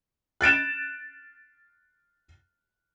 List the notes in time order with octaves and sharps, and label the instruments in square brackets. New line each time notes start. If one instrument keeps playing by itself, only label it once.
[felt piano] F#6 A6 D7 E7